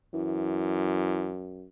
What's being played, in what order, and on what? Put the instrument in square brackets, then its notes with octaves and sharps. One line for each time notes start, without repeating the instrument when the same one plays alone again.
[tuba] F#2 [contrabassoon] E3